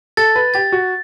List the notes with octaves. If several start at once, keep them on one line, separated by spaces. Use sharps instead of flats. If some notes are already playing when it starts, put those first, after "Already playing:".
A4 A6
B4
G4 A6
F#4